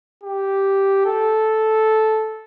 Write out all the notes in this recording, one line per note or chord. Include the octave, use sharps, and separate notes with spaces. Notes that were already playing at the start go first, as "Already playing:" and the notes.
G4
A4